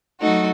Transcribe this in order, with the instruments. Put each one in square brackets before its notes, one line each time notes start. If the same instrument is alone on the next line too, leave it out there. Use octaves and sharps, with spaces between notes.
[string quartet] F#3 A3 D#4 F#4